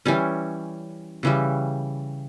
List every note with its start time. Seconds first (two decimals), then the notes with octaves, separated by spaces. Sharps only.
0.06 E3 G3 C#4
1.23 C#3 E3 G3